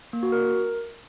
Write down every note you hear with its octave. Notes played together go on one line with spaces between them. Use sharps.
A#3
F#4
A#4